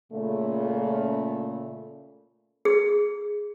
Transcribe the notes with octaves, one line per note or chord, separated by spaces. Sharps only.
A#2 C#3 A3
G#4